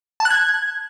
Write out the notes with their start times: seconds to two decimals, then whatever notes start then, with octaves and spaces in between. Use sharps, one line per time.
0.20 A5
0.25 F#6
0.30 G#6